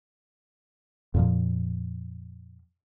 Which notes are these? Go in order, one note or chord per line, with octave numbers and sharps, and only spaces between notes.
F2 A#2 F3